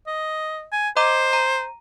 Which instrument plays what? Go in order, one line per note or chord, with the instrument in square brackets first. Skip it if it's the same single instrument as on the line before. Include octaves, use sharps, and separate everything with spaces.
[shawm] D#5
G#5
[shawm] C5 [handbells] D#5 A#5 D6
[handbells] A#5